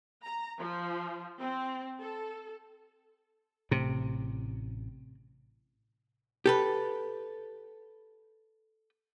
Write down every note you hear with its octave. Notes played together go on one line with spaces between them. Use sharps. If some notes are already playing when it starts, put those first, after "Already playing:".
A#5
F3
C4
A4
A1 A2 C3 C4
G4 A4 B4